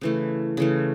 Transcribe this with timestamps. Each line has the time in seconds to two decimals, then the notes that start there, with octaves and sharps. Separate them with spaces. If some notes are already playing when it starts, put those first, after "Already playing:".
0.01 C#3 E3 A3
0.57 C#3 E3 A3